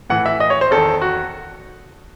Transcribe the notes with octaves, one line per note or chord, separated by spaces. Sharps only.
A2 E3 F#5
E5
D#5
C#5
C5
E2 D#3 A4
F#4